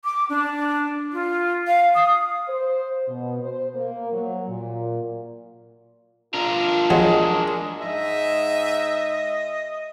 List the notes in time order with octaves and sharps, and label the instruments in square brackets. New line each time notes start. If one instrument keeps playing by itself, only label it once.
[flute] D6
D4
F4
F5
D#6
[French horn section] C5
B2
C5
A#3
F#3
A#2
[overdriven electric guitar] D4 A#4 [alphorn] F4
[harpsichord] F#3 [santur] G#3
[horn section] G#2 E5 [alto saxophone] D#5